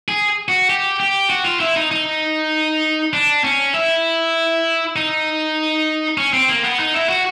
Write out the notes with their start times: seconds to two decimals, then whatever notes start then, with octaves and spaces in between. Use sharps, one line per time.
0.09 G#4
0.48 F#4
0.70 G4
1.00 G4
1.30 F#4
1.45 F4
1.60 E4
1.76 D#4
1.91 D#4
3.13 D4
3.44 C#4
3.74 E4
4.96 D#4
6.18 C#4
6.33 C4
6.49 A#3
6.64 B3
6.79 D#4
6.94 E4
7.09 F#4